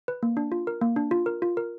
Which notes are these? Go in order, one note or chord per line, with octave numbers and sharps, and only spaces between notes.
B4
A#3
D4
F4
A#4
A#3
D4
F4
A#4
F4
A#4